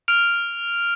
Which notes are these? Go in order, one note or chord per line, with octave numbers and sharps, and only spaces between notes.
F6 D7 F7